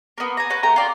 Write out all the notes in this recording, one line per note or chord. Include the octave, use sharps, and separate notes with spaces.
A#3 B3
G#5 A#5
B4 C#5 F#5
A3 G4 A#5
F4 D5